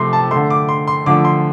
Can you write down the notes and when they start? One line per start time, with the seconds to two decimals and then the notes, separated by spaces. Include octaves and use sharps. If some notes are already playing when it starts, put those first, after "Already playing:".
Already playing: C3 F3 A3 C6
0.13 A5
0.31 D3 A3 C6
0.50 D6
0.69 C6
0.88 C6
1.06 D3 F3 A3 D6
1.25 C6